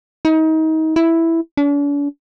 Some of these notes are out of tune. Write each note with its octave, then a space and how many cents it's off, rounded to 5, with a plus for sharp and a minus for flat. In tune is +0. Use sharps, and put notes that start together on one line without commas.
D#4 +30
E4 +0
D4 -45